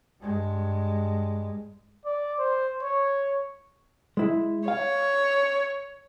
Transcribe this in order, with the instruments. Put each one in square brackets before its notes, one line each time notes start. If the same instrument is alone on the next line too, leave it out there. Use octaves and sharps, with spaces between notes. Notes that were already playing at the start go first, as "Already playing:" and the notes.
[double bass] G2 G#3
[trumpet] D5
C5
C#5
[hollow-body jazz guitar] G#3 E4
[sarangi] C#5 [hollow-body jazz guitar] F5